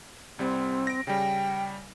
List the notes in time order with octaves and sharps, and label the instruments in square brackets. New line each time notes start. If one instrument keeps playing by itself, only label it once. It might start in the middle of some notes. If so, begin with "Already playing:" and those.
[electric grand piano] C2 G3 [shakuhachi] C4
[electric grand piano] A#6 D7
[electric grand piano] C#3 G3 [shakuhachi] G5